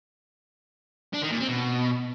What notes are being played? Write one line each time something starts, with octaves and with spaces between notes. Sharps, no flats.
D4
D#3
A#2
C4
B2